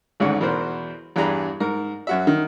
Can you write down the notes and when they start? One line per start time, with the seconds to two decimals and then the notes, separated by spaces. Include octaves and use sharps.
0.20 G#1 D2 G#2 C#4 F#5
0.41 E2 B2 A#4 C5
1.16 E2 G2 G#4 A#5 B5
1.60 G#2 A#4
2.07 F#2 F#4 E5
2.27 D#3